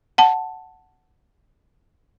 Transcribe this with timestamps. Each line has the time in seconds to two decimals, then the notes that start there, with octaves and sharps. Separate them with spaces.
0.18 F#5 A5